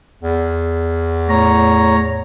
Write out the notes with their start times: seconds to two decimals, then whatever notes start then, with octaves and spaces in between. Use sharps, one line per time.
0.23 E2
1.29 A2 C#5 A#5